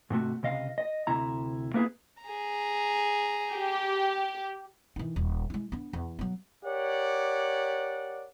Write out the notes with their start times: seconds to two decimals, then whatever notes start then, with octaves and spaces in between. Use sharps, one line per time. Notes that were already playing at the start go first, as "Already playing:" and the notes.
0.10 G#2 C3 A3 F#4
0.43 C#2 C3 D#5 F5
0.78 D#5
1.07 D2 C3 E4 A#5
1.74 A#3 B3 E4 G#4
2.22 G#4 A#5
3.52 G4
4.96 D#3 E3
5.16 D#1
5.50 G#3 E4
5.72 B3 D4
5.93 E2
6.19 F#3 B3
6.65 G4 A#4 C#5 D5 F#5